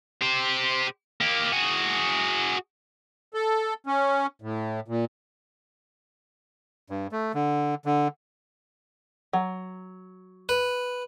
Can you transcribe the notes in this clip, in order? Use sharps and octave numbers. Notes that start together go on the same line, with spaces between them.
G4 C5
A#3 G4
F#4 G#4
A4
C#4
A2
A#2
G2
A3
D3
D3
F#3
B4